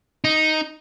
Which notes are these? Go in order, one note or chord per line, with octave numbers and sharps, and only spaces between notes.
D#4